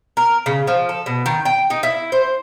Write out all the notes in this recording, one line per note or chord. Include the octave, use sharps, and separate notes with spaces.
A#4
C#3
F3
A4
B2
D#3
G5
D#4
E4
C5